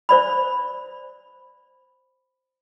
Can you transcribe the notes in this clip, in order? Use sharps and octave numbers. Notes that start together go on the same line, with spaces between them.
C5 D5 B5